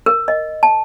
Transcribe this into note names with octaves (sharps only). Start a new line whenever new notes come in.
A#4
D#5
A5